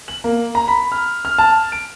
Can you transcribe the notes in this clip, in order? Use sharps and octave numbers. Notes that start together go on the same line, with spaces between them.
F#7
A#3
A#5
B5
F6
F6
A5
D7